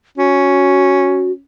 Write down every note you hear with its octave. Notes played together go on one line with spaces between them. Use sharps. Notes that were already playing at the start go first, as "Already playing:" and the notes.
C#4 F#4